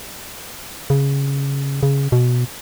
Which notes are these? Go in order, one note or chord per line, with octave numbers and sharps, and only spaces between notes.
C#3
C#3
B2